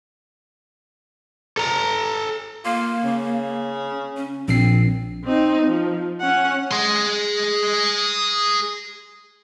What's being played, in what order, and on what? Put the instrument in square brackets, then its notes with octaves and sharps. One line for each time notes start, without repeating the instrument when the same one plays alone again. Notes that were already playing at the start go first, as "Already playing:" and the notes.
[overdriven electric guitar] A4 A#5
[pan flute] A#3 [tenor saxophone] F4
[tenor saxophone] C#3
[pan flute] C#4
[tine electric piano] A#1 C7 [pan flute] C4
[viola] C4 D#4
F3
C#4 F#5
[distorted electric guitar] G#4 C6